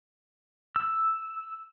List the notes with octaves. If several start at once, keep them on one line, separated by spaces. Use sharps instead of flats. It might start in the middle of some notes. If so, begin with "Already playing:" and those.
E6